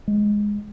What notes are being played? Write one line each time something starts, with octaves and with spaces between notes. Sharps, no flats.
G#3